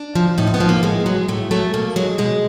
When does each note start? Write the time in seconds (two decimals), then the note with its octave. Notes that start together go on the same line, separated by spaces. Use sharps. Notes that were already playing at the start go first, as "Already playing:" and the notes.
Already playing: D4
0.15 F3
0.38 A2 D#4
0.47 C4
0.54 B3
0.60 F3
0.69 A#3
0.83 A2 G#3
1.06 F#3 G#3
1.28 A2 A3
1.51 F#3 A3
1.74 B2 A#3
1.96 F#3 G#3
2.18 B2 G#3